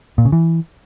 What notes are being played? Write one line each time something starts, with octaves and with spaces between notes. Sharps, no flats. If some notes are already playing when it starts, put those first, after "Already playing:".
A#2
C#3
E3